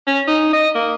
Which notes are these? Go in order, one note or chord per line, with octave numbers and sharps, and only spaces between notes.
C#4
D#4
D#5
A#3